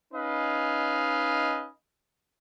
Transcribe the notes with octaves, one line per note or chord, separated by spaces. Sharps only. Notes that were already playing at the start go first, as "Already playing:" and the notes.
C#4 D#4 B4 D#5 F5 G#5